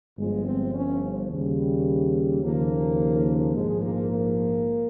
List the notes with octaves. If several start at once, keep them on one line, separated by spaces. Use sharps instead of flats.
G1 G2 F3 G#3
C4
C#4
D#2 C#3 G3
D#2 C#3 F3 A#3
A#1 G#2 F3 G#3
A#3
A#3